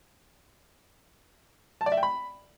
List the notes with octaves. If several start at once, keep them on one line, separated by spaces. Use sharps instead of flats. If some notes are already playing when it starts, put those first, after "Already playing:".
A5
D5
E5
G5
B5